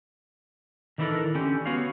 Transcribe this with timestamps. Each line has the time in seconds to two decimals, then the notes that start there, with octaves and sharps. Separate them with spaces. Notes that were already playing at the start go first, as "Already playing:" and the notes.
0.98 D#3 E3 D4 E4 A4 A#4
1.35 D3 C#4 G4
1.66 B3 F#4 C#5 F5